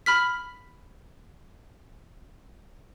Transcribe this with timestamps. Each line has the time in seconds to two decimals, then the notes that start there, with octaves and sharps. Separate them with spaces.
0.06 B5 F6 B6